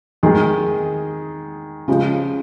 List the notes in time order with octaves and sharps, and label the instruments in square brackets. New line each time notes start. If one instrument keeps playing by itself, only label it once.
[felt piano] D#3 G#3 G#4
C#3 F3 G#3 G4